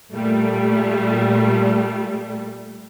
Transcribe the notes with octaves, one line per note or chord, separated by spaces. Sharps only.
A#2 G3 A3